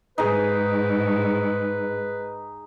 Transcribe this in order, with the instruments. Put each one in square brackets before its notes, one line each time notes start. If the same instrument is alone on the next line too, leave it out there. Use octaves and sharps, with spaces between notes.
[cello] G#2 [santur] D#4 G#4 [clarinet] B4